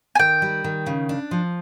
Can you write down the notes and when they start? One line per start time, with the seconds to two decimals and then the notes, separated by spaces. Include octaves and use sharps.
0.15 G#5
0.19 D#3 G5
0.42 G3
0.64 D#3
0.86 C#3
1.09 D4
1.31 F3